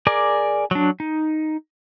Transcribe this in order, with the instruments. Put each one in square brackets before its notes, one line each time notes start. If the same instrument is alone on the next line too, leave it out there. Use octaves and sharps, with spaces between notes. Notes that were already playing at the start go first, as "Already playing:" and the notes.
[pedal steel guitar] G#4 A#4 D5 D6
F#3 D4
D#4